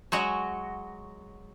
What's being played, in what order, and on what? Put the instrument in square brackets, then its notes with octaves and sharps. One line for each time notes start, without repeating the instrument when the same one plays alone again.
[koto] F#3 G#3 F#4